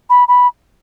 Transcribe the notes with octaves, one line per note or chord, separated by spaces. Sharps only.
B5
B5